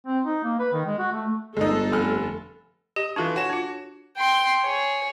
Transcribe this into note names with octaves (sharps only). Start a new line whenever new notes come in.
C4
D#4
A#3
B4
D#3
G#3
F#4
A3
G1 G#3 D#4 A4
F1 F6
G4 D#5
E3 D4 F4 F#4 A4 C#6
F#4 C#5 G#5 E7
D4 F4
G5 C6
G#4 C#5